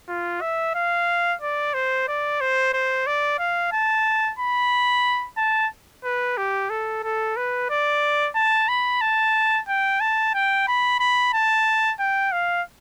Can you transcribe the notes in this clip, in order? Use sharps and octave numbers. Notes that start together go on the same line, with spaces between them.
F4
E5
F5
D5
C5
D5
C5
C5
D5
F5
A5
B5
A5
B4
G4
A4
A4
B4
D5
A5
B5
A5
G5
A5
G5
B5
B5
A5
G5
F5